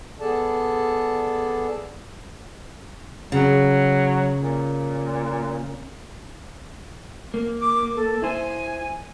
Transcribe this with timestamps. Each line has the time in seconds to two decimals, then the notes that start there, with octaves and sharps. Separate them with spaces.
0.20 B3 G#4 A4 D5 A5
3.32 C#3 F#3
4.39 A#2
7.34 A#3
7.61 D6
7.96 A4
8.22 E4 C5 G#5